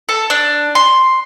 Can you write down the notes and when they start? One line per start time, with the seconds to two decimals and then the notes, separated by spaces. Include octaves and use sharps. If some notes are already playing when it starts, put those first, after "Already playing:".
0.09 A4
0.30 D4
0.75 C6